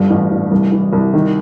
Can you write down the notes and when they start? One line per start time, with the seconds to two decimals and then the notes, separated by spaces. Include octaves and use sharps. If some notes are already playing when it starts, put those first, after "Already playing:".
Already playing: G1 G2
0.10 A1
0.31 A1
0.51 C2
0.72 E3
0.93 C2
1.14 D#3